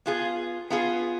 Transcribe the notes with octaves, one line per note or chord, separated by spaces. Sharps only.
B3 F4 G#4
B3 F4 G#4